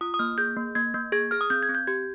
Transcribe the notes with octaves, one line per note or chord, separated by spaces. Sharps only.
F4 D#6
D#6
A#3 F6
G#4 G6
A#3
A#3 G#6
A#3 G6
G#4 G#6
G#4 F6
D#6
C4 G6
G#6
C4
G6
G4 G#6